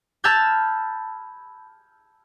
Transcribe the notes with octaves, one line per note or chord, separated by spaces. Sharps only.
A5 B5 E6 F6 G6 G#6